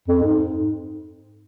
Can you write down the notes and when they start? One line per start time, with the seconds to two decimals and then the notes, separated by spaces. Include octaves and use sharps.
0.08 F2
0.23 G#2